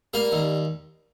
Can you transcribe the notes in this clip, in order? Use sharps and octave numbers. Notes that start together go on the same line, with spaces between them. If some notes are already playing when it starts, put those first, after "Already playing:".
G3 A#3 A#4
D#2